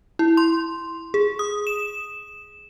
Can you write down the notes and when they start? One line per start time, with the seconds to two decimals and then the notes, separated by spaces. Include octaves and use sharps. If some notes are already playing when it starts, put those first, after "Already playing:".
0.19 E4
0.37 C6
1.14 G#4
1.39 D#6
1.67 E7